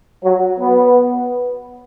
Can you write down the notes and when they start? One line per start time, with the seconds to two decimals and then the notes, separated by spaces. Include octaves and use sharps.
0.23 F#3
0.59 B3